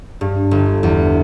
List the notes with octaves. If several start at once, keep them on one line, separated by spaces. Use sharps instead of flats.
G2
G1
E2